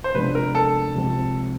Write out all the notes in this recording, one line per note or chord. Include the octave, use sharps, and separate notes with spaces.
C5
C3 F3 G#3 B3 D4 B4
A#4
A4
C2 C3 F3 G#3 C4